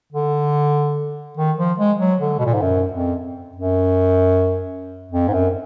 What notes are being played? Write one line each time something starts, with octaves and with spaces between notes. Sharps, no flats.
D3
D#3
F3
G#3
F#3
D3
B2
A#2
G#2
F#2
F2
F#2
F2
G#2
F#2